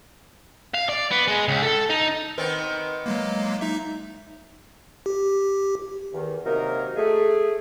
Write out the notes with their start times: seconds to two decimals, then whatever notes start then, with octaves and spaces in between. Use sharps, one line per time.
0.74 F5
0.89 D5
1.11 B3
1.28 G#3
1.48 C#2
1.63 A4
1.90 D#4
2.38 D#3 B3 C4
3.06 F#3 G#3 A#3
3.61 D#4 E5
5.06 G4
6.13 E2 D#3
6.45 C3 F#3 A#3 D#4 A#4
6.96 A3 G#4